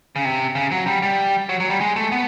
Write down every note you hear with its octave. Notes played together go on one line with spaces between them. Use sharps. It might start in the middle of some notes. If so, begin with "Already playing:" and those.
C#3
C3
C#3
F#3
G3
G3
F#3
F#3
G3
G#3
A3
B3